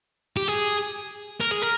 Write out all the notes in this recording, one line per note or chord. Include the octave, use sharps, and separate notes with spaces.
G4
G#4
A#4
G#4
A#4